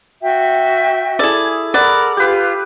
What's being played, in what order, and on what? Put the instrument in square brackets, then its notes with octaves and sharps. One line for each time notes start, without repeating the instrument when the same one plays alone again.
[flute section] F#4 E5 G5
[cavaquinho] E4 D5 [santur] G#4 A4
[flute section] A#4 [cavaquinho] D5 [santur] F#5 B5
[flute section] F4 [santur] G4 B4